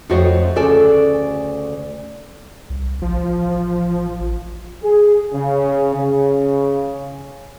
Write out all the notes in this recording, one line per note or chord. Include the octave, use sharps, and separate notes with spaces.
F2 A3 C4 F#4 C#5 D#5
D2 C#3 A4 D5 G#5
C2
A1 F3
G#4
C#3
C#3